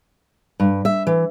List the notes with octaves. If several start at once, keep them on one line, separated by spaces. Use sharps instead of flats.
G2
E5
E3